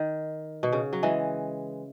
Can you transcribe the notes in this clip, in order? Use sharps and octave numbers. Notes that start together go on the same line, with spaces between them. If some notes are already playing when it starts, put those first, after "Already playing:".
Already playing: D#3
B2
C#3
F#3
E3 G#3